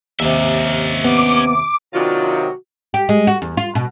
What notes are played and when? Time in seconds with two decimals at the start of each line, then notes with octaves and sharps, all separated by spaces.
0.20 D#2 C3 C#4 E5
1.04 B3 D6
1.94 C3 D#3 F#3 D4 F4 F#4
2.94 G4
3.09 G#3
3.27 F#4
3.42 E2
3.57 F4
3.75 B2